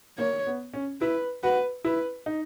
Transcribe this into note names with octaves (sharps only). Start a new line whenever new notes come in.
A#3 C#5
B3
C#4
E4 B4
F#4 B4
E4 B4
D#4